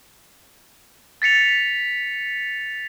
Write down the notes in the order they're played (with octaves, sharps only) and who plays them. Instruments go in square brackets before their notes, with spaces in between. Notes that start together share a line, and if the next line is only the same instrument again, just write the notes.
[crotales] A6 B6 C#7 F7